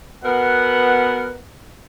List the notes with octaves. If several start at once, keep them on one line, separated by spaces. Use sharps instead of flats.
B2 B3 A#4 F#5